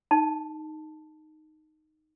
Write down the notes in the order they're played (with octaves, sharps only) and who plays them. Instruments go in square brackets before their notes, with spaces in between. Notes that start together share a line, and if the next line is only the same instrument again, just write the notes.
[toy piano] D#4 A5